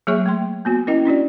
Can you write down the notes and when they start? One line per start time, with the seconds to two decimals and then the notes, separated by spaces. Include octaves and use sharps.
0.07 F#3 A#3 G#4 C#5 E5 C#6
0.26 A3 G5 C6
0.65 A#3 B3 F#4
0.87 C#4 E4 A#4 D#5 G5
1.05 C#4 D4 F#4 D5